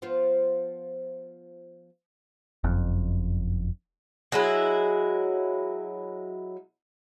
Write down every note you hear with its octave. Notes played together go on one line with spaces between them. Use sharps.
F3 B3 F4
F#1 F2
F#3 G#3 E4